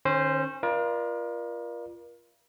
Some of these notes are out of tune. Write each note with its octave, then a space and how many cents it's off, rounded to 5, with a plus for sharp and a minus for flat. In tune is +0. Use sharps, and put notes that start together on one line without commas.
D#3 -35 C#4 -35 C5 +0
F4 -20 A#4 +35 D5 +30